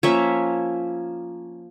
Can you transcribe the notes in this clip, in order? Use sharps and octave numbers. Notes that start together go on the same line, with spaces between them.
F3 A#3 C#4 C#5 E5